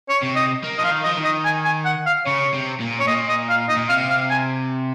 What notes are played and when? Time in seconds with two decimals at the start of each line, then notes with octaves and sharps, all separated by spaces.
0.09 C#5
0.23 C3
0.36 D#5
0.64 A#3
0.78 F3 D#5
0.84 F5
0.91 D#3
1.04 F3 D#5
1.17 D#3
1.24 D#5
1.45 G#5
1.65 G#5
1.85 F#5
2.06 F5
2.26 C#3 C#5
2.54 C3
2.80 A#2
3.00 C#5
3.07 A#2 D#5
3.29 D#5
3.49 F5
3.69 D#5
3.77 A#2
3.89 C3 F5
4.10 F5
4.30 G#5